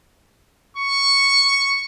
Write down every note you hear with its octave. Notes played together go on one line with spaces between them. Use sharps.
C#6